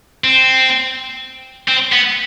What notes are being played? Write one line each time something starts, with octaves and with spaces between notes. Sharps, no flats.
C4
C4
B3